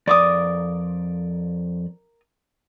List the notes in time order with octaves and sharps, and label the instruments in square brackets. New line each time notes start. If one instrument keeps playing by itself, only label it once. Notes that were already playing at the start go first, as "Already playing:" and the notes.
[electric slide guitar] F2 D5 [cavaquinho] A#4 D6 D#6